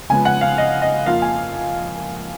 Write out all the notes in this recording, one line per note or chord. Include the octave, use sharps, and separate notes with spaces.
C#3 F3 G#3 B3 G#5
F#5
F5
D#5
D#5
F2 F3 A#3 F4 F5
G#5